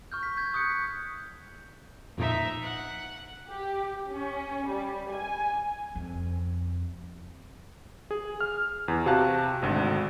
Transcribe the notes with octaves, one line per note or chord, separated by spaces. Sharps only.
C#6 F6 G6
B6
G6 G#6
C#6 D#6 F#6 G6 C#7
B6
F2 A#2 F3 D#4 E5
F#5
G4
C#4
G3
G#5
F2
G#4
F6
E2
C3 F#4 F5 A5 F#6
G#1 D2